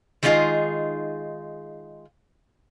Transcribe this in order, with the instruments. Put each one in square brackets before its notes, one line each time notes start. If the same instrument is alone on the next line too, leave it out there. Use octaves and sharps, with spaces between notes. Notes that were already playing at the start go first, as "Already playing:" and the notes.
[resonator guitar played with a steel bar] D#3 G#3 A3 D#4 F4 G#4